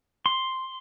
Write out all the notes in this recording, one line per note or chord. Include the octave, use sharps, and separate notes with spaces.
C6